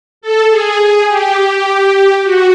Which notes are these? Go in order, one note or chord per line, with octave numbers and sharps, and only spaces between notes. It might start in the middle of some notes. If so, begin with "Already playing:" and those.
A4
G#4
G4
F#4